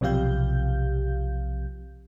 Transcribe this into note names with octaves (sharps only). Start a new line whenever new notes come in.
B1 C3 F3 G4 F5 G6